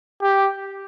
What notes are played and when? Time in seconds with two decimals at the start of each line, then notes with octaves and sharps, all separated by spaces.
0.22 G4